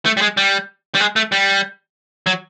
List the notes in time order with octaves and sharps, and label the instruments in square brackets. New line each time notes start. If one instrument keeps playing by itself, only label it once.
[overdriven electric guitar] A3
G3
G#3
G3
G3
G#3
A3
G3
F#3